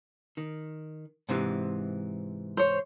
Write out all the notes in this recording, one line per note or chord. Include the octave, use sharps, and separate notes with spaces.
D#3
G#2 C3 E3
C5 C#5